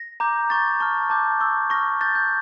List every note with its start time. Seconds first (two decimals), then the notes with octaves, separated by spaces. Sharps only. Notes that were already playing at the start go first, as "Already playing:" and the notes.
Already playing: A#6
0.20 A#5 D6 G6
0.50 A#5 C#6 G6 A6
0.80 A5 C#6 F6
1.10 A5 D6 G6
1.40 C#6 E6 G6
1.70 C#6 F6 A#6
2.01 C#6 G6 A6
2.15 G6